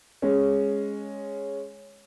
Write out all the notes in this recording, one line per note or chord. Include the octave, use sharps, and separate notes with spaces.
G#3 C#4